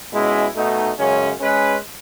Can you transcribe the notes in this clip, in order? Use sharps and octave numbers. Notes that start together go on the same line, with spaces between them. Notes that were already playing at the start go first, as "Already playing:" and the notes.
B2 G#3 C#4 E4
B2 A3 D#4
F#2 C#3 G#3 C#4
G#3 C#4 G#4 B4